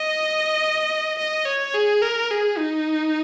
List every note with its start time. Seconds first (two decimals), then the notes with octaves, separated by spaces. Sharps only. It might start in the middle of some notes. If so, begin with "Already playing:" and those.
Already playing: D#5
1.18 D#5
1.46 C#5
1.74 G#4
2.02 A#4
2.31 G#4
2.58 D#4